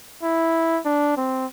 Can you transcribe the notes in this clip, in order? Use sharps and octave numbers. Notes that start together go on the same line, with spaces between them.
E4
D4
C4